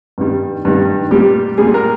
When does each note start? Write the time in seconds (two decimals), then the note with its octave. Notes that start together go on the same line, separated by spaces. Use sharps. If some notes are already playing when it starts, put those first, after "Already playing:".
0.18 G2 D#3 G3
0.65 G2 D#3 G3
1.11 A#2 G3 G4
1.58 A#2 G3 G#4
1.74 A#4